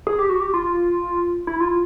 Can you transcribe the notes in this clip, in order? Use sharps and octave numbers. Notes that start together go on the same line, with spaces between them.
G#4
G4
F#4
G4
F4
E4
F4